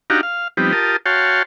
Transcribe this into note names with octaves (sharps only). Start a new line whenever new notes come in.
D4 D#4 F#4 G4 F5 A#5
F5
F3 G3 B3 C4 D#4 G4
F4 G4 A#4 A5 D#6
F#4 C#5 F5 G5 A5 C6